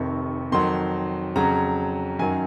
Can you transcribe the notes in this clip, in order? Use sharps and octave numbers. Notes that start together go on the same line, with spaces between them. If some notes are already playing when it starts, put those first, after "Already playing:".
Already playing: F1 F2 C3 D#3 C#6
F2 D#3 F#3 C6
F2 C#3 F#3 A#5
F#2 D#3 F#3 G#5